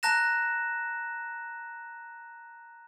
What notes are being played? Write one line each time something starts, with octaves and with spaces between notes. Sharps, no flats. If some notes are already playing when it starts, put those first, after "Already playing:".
A5 A#5 F#6 A#6 E7